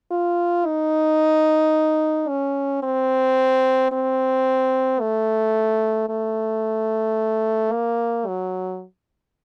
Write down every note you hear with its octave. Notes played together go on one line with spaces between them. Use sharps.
F4
D#4
C#4
C4
C4
A3
A3
A#3
F#3